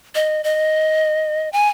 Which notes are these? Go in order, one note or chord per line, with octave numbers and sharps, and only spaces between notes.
D#5
D#5
G#5